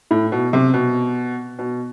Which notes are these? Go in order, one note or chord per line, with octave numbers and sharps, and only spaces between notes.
A2
B2
C3
B2
B2